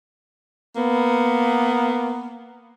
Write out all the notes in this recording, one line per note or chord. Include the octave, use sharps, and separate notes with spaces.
A#3 B3